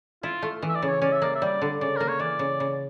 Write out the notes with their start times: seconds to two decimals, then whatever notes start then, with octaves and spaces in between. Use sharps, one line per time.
0.23 E4 F4
0.42 A3
0.62 E3
0.69 E5
0.76 D5
0.82 C#3
0.88 C#5
1.02 C#4 D5
1.13 E5
1.22 A#3 D5
1.35 E5
1.42 G3 D5
1.62 D3
1.81 C#3 D5
1.97 A#3 A#4
2.09 C#5
2.20 E3 D5
2.39 C#3
2.60 C#3